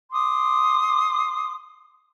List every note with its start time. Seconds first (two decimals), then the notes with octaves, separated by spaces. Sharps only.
0.12 C6 D6 D#6